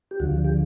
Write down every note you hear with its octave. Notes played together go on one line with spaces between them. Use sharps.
G4
D2 D3 F3 F#4
G4